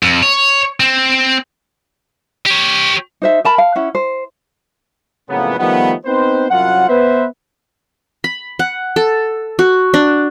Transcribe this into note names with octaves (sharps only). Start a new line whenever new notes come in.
F2
C#5
C4
G4 C#5
D#4 C5 E5
A#4 A5 B5
F5
C#4 E4 F#5
C5
F2 A2 C#3 F#3 A#3 B3
D#3 F3 G3 A3 B3
B3 C4 D#4 B4 C5
C2 F#2 F#3 F4 F#5
B3 B4 C5 E5
B5
F#5
A4
F#4
D4